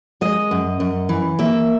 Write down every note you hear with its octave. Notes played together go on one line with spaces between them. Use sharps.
G#3 D#5
F#2
F#2
E3
A#3 E5